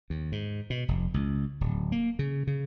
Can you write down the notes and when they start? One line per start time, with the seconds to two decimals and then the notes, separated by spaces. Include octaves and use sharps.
0.10 D#2
0.32 G#2
0.70 B2
0.88 F1
1.14 C#2
1.61 D1
1.92 A#3
2.19 C#3
2.47 C#3